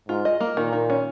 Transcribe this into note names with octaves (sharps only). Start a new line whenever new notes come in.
G#2 F4
D#5
A#3
A#2 D#3
D#3
C#4